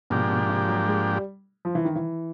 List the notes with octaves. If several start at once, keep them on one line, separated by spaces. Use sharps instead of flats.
G#2 B2 F3 A#3 D4 G4
B2
C3
F#3
G#3
G3
F3
E3
D#3
E3